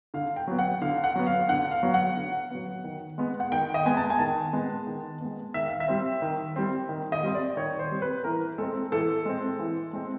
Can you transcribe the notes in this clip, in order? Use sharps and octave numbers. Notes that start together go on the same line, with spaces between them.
D3 F5
G5
F#3 B3
F#5
D3 F5
F#5
F#3 B3
F5
D3 F#5
F5
F#3 B3
F#5
D3
F#3 B3
D#3
G#3 B3
F#5
D#3 G5
D#5
G#3 B3 G#5
A5
G#5
D#3 A5
G#3 B3
D#3
G#3 B3
D#3 E5
F5
E5
G3 C4
D#3
G3 C4
D#3
D#5
G3 C4
D5
D#3 C#5
C5
G3 C4
B4
E3 A#4
G#3 C4 A4
E3 A4
G#3 C4
E3
G#3 C4